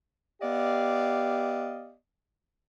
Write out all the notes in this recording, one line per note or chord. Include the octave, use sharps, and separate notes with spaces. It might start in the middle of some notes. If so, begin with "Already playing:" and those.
B3 G4 D5 D#5 F5